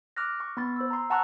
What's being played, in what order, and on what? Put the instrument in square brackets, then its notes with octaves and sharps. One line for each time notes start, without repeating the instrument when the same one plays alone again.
[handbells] D6 F6 F#6 A#6
C#6 F6
B3 B5 C6 A6
C5 E6
A#5 C6
F#5 A5 A#5 C#6 E6 F#6